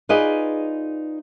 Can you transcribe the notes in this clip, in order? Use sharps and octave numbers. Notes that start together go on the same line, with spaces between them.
D#4 F4 G#4 B4 D5 D#5